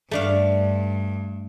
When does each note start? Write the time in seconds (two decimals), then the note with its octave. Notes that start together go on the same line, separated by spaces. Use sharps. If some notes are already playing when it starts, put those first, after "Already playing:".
0.11 G2 A3 D4 F5